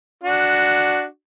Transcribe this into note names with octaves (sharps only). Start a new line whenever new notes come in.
D4 F#4